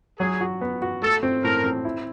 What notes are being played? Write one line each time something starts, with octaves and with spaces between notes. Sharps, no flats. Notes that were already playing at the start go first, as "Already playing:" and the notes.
F#3 G#4
F#4
B3
F#4
A3 A4
C4
A2 A#4
C4
E4